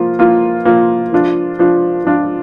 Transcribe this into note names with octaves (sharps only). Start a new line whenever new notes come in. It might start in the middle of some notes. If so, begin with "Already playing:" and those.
Already playing: F3 A#3 F4
F3 A#3 F4
F3 A#3 F4
F3 D4 F4
F3 D4 F4
F3 D4 F4